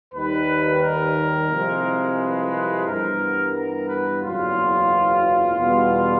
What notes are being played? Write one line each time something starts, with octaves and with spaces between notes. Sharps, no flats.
D#2 D#3 G3 B4
A#4
C2 C3 F3 G#3
B4
G2 E3 G3 B3 A#4
A#4
B4
F#1 E2 B2 F#3 F4
E2 B2 G3 B3